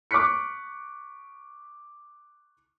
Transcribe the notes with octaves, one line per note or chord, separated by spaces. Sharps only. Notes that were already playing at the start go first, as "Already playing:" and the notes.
C#6 D6 F6 F#6 B6 C#7